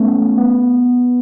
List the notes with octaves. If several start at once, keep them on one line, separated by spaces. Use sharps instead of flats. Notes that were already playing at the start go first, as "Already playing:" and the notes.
Already playing: A3 B3 C#4
B3